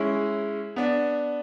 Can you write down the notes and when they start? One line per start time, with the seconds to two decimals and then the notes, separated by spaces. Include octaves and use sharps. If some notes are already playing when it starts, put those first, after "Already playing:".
Already playing: G#3 C#4 E4
0.76 B3 D4